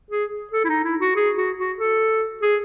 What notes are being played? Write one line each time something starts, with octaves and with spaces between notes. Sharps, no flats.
G#4
A4
E4
D#4
E4
F#4
G#4
F#4
F#4
A4
G#4